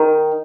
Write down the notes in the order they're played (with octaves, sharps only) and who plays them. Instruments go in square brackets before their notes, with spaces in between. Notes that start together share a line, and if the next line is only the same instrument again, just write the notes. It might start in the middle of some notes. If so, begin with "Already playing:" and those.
Already playing: [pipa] D#3